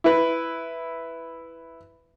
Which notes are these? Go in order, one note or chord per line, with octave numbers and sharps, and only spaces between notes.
E4 B4